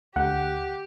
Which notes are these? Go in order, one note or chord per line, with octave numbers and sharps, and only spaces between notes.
D2 G4 F#5